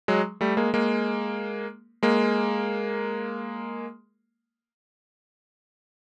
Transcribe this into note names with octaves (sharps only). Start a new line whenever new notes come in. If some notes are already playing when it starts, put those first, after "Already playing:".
F#3 G#3
G3 A3
G#3 A#3
G#3 A#3
G#3 A#3